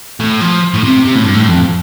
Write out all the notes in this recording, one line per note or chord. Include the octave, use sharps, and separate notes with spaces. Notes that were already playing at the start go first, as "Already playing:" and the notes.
A2
F3
A2
C3
C3
A2
G2
A2
F2